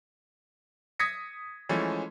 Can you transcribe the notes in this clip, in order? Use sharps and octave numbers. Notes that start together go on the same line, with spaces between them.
D#6 G#6 A#6 B6 C#7
E3 F3 G#3 A3 C#4